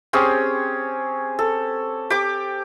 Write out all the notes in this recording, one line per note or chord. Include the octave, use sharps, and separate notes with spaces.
C4 C#4 G4 G#4
A4
G4 D6